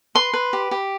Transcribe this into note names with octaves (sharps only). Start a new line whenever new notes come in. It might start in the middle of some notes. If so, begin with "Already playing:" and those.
B4 C6
B4
G4
G4